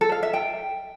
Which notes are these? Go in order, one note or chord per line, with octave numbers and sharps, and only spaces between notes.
A4
F5
E5
G5